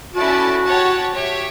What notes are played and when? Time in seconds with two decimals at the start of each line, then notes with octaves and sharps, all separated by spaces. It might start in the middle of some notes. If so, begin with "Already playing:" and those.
0.14 C#4 E4 F#4 A4 D5 A5
0.64 G4 C#5 F#5 A5
1.13 G4 C#5 E5